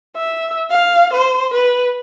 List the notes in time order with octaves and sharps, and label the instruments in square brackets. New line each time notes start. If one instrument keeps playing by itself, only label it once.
[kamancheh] E5
F5
C5
B4